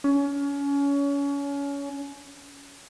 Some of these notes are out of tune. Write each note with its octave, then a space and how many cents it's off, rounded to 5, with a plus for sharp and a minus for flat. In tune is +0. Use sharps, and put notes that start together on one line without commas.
C#4 +30